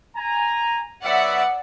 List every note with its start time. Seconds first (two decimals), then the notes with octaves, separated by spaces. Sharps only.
0.16 G#5 A#5
1.04 F#3 B3 D5 E5 F#5